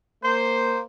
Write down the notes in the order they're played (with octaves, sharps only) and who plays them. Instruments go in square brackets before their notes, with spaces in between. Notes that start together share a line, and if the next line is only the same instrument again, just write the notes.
[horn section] A#3 C5